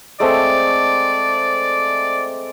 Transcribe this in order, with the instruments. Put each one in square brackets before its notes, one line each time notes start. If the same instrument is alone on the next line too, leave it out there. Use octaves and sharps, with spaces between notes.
[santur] G#3 A3 C4 [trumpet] D5